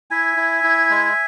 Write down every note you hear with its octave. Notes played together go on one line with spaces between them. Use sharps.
E4 E5 G#5
E4
E4
G#3